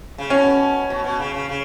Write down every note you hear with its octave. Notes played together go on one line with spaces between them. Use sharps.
C#3
B2 C#4
B2
B2
C#3
C#3
C#3